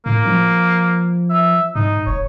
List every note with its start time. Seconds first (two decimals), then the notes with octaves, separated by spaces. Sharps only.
0.06 A2 A#3
0.25 F3
1.30 E5
1.76 G#2 D#4
2.07 F1 C#5